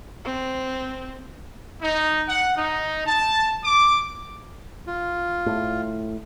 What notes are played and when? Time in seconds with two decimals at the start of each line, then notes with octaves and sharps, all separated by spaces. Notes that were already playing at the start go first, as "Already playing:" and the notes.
0.25 C4
1.82 D#4
2.28 F#5
2.57 D#4
3.07 A5
3.64 D6
4.87 F4
5.46 A2